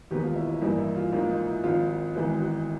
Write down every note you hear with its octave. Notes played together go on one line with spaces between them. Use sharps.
E1 D#2 D#3 G#3 B3 G4
F4
E4
E4
A1 G2 E3 G3 A#3 D#4
E4
F4
A1 G#2 F3 A#3 F4
D#4
E4
G#1 G#2 F3 F4
F4
G#1 G#2 E3 G#3 B3 F#4
F#4